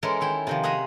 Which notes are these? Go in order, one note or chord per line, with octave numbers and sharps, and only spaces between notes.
E3 G#3 C#4 E4 A4 A#4
D#3 E4 G5
C3 D#3 F3
G#4 D#5 E5 F#5 A#5